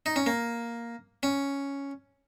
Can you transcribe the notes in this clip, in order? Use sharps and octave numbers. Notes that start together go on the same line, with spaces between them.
D#4
C#4
A#3
C#4